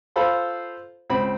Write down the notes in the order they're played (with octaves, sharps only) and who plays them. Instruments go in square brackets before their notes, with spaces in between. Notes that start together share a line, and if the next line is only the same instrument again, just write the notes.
[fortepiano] F4 A4 C5 F5 B5
C#2 C4 B5